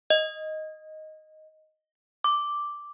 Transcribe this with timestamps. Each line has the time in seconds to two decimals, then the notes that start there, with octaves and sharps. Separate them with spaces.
0.10 D#5
2.24 D6